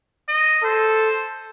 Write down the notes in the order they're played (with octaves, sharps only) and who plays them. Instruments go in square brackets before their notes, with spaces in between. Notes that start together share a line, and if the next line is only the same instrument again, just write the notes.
[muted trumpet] D#5
[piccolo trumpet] A4 [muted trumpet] C5